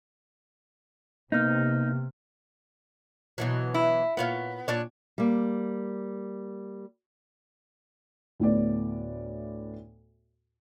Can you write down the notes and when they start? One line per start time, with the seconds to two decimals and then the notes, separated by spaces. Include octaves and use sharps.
1.32 C3 A#3 B3 D#4 F6
3.38 B2 E3 F#3
3.74 E4
4.17 A#2 B3 C#5 F5
4.68 A#2 D4 C#5
5.18 G3 A#3
8.40 D2 A2 B3 D5